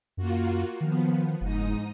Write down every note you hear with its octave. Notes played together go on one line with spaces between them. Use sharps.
F#2 A#3 F4 F#4
D#3 F3 B3
F#1 G#2 D#4 D#6